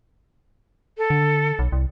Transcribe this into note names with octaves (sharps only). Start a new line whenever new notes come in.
A4
D3
B1
C2